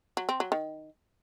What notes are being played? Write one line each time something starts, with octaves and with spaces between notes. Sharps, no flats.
F#3
C4
F#3
D#3